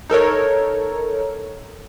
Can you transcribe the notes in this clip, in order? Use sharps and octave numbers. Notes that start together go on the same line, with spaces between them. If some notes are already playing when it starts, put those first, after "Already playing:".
D#4 A4 A#4 C#5